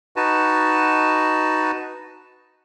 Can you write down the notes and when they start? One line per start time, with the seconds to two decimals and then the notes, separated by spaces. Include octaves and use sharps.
0.16 D#4 F#4 B4 A5